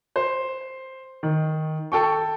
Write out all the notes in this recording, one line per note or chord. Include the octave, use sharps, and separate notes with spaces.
C5
D#3
A4 G5 C#6